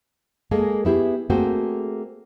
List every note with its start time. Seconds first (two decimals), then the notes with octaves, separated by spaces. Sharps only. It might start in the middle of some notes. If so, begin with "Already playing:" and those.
0.51 G#3 A#3 G#4 A4
0.85 B3 E4 G4 G#4
1.30 A3 A#3 C4 F#4 G#4 G5